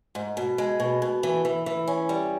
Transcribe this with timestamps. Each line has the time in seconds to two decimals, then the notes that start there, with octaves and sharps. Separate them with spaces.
0.15 G#2
0.37 B2
0.58 G#3
0.80 B2
1.02 B2
1.23 E3
1.45 E3
1.66 E3
1.87 C#4
2.09 G3